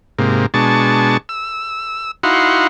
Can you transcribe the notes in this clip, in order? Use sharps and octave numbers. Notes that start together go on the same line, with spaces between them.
G#2 C3 A#3
B2 G#3 D4 A5 C#6
E6
D#4 E4 F#4 F5 F#5 C6